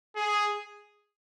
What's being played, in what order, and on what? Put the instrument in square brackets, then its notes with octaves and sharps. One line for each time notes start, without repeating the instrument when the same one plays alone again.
[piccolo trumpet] G#4